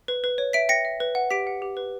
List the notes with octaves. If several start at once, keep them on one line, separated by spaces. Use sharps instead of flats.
B4
B4
C#5
E5 B6 D7
G5 A#6 C#7
E5
B4
F#5
G4 B6 D7
F#5
G4
B4